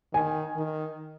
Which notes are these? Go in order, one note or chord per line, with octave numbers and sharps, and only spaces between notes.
D#3 G#5
D#3